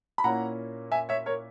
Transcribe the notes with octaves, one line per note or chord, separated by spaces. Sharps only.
B5
A#2 A#3 C#4 E4 F#5 A#5
E5 G#5
C#5 E5
A#4 C#5